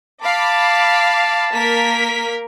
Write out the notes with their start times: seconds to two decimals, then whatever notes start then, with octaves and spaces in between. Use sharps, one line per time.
0.22 F5 A5 B5 D6
1.53 A#3 A#4 B6